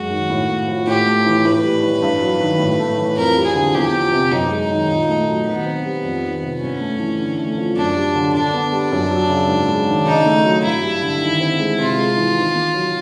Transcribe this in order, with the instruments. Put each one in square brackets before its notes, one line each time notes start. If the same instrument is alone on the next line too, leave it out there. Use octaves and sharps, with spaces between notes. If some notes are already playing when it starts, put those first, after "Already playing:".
Already playing: [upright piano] F#2 G#3 [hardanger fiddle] F#4
[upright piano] D#3
A2
A#3
F3
[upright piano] A2 [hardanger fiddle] G4
[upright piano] A3
E3
[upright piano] A2 [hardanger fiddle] B4
[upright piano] G3
E3
G2
F#3
D#3
A2
A3
E3
[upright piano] F2 [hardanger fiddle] A#4
[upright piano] G3
[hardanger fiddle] G#4
[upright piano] D3
[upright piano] E2 [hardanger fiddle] G4
[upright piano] F3
C3
[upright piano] F#2 [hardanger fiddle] D#4
[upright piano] G#3
D#3
A#2
A3
F#3
[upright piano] D#3 [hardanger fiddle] B3
[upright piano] C4
G3
F2
D#3
C3
[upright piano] G2 [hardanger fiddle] C#4
[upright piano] A3
E3
D3
A3
F3
[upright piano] F#2 [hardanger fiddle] D4
[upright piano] G3
D3
[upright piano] D3 [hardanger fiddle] D4
[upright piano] B3
G3
F#2
F#3
C#3
G#2
G#3
D#3
[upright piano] C#3 [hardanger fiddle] D#4
[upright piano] A3
F#3
[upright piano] G2 [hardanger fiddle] E4
[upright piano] G3
D3
D#3
C4
G#3
[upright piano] C3 [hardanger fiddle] F4
[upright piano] G#3
E3
D#3
A#3
F#3